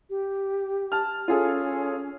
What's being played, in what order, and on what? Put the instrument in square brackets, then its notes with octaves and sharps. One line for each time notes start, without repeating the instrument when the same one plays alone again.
[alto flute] G4
[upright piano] A5 F6
[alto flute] C#4 [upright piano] F4 G#4 A4